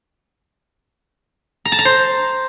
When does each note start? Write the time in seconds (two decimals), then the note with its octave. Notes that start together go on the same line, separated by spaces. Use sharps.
1.65 A#5
1.72 A5
1.79 A#5
1.85 C5